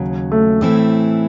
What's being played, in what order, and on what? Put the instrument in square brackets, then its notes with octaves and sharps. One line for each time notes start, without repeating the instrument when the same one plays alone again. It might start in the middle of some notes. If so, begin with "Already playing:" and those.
Already playing: [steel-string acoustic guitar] D#2 C#3 F#3
[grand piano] A3
[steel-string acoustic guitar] A2 E3 C4 E4 [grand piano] A3